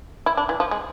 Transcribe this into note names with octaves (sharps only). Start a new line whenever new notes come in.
E4
D4
E3
F3
G#3